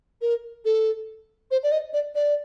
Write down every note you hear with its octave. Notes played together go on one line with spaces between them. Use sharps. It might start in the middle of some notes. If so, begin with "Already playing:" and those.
A#4
A4
C5
D5
D#5
D5
D5